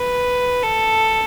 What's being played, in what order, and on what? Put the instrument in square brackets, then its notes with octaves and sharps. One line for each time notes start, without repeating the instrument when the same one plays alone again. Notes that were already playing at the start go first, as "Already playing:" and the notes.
Already playing: [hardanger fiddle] B4
A4